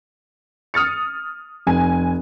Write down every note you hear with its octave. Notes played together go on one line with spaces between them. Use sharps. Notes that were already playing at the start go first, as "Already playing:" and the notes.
D#6 F6 A6 C#7
F1 G#5